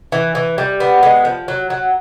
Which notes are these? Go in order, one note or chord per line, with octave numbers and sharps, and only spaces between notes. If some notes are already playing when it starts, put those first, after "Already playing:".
E3
E3
G3
B3
G#3
F3
F#3
F#3